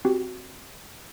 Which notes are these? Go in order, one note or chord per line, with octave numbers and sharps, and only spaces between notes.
C4 F#4 G4